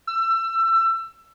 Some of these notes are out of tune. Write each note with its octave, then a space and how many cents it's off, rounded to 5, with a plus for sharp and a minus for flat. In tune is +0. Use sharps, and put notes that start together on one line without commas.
E6 +25